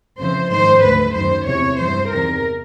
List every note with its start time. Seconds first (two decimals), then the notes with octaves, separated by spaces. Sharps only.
0.19 F2 C#3 E3 C5
0.51 G#2 D#3 C5
0.84 D2 D3 B4
1.15 F#2 D#3 C5
1.47 E2 C3 E3 C#5
1.79 G2 E3 C5
2.11 E2 C3 D#3 A#4